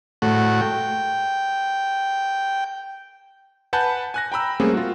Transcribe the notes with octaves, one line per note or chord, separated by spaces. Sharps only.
A2 A3 F#4
G5
B4 F#5 G#5 A5 B5 G6
G#5 F#6 A#6
G5 A#5 B5 E6
G3 A3 A#3 C4 C#4 G#4
F4 F#4